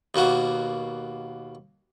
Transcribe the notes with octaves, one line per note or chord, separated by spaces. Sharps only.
D#2 B2 A#3 F#4